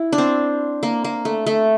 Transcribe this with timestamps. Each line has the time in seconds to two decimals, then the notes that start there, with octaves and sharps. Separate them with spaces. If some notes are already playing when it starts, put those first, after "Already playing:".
Already playing: E4
0.12 D4
0.18 C4
0.83 A#3
1.04 A#3
1.25 A3
1.46 A3